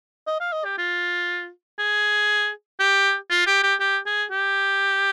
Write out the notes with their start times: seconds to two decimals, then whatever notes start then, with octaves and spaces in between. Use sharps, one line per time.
0.27 D#5
0.40 F5
0.53 D#5
0.65 G4
0.78 F4
1.79 G#4
2.80 G4
3.30 F4
3.47 G4
3.63 G4
3.80 G4
4.06 G#4
4.31 G4